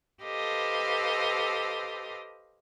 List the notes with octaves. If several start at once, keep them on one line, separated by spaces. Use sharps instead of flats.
G4 A4 B4 C5 D#5 F5